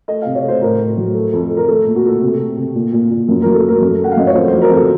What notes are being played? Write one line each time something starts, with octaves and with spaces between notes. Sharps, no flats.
A3 D#5
C3 F5
C#5
A3 C5
A2 A#4
A2
F#3
A3
F2
A3
A#4
A3 A4
A#2
F#4
A3 A4
C3
A3
C3
A#2
A#2
A#2
F#2
F#3 A#4
A4
A3 A#4
F#2
A3
F#5
F5
F#2 D#5
C#5
F2 C5
F#3 C5
A#4
F2 A4